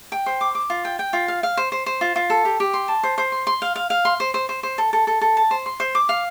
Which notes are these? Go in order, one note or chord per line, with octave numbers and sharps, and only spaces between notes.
G5
C5
D6
D6
F4
G5
G5
F4
F5
F5
C5
C5
C5
F4
F4
A4
G4
G4
C6
A5
C5
C5
C6
C6
F5
F5
F5
C6
C5
C5
C5
C5
A4
A4
A4
A4
A5
C5
C6
C5
D6
F5